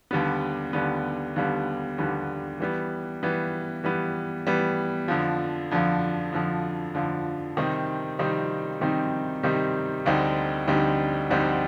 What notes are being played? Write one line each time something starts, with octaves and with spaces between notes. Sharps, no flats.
D#2 D3 G3 B3
D#2 D3 G3 B3
D#2 D3 G3 B3
D#2 D3 G3 B3
E3 G3 B3
E3 G3 B3
E3 G3 B3
E3 G3 B3
F2 D3 F3
F2 D3 F3
F2 D3 F3
F2 D3 F3
C3 D#3 G3 C4 D#4
C3 D#3 G3 C4 D#4
C3 D#3 G3 C4 D#4
C3 D#3 G3 C4 D#4
D2 D3 G3 C4 D#4
D2 D3 G3 C4 D#4
D2 D3 G3 C4 D#4